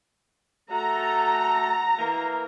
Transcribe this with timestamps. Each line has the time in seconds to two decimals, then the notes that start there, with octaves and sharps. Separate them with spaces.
0.71 A3 F#4 A4 A#5
1.99 E3 A#3